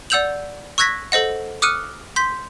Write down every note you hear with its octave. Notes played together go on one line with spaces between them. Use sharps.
D5 F#5 E6 G6 F7 F#7
C#6 E6 F#6 G#6 A#6 B6
A4 C5 D#5 F#5
D6 D#6 F6 F#6 C#7 D#7
C6 G6 B6